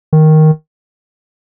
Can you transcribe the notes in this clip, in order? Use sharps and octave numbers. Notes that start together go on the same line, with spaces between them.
D#3